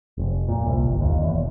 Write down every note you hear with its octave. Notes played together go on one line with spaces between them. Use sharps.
F1
A#2
C2
G1
D#2
E2
E1